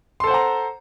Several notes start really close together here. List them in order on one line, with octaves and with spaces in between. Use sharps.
C6 A4 C5 F#5 A#5